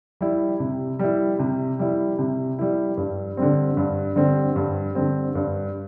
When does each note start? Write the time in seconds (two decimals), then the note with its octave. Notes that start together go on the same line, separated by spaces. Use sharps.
0.21 G3 E4
0.60 C3
0.99 G3 E4
1.39 C3
1.79 G3 E4
2.19 C3
2.59 G3 E4
2.97 G2
3.37 D3 G3 C4
3.77 G2
4.16 D3 G3 C4
4.56 G2
4.95 D3 G3 C4
5.35 G2